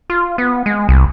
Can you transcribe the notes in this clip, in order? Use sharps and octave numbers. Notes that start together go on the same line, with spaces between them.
F4
B3
G#3
C2